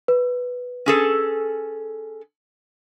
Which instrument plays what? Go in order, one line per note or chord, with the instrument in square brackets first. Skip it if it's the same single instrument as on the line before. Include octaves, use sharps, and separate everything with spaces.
[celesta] B4
[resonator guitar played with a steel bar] C#4 G#4 A4